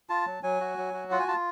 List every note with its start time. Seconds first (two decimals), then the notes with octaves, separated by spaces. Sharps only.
0.09 F4 A5
0.27 F#3
0.43 F#3 G#5
0.61 F#4
0.78 F#3
0.94 F#4
1.11 F4 F#5
1.20 G#5
1.28 F4 A5